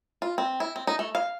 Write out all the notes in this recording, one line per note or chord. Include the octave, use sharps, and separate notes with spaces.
F4
C4
E4
C4
D#4
A3
F5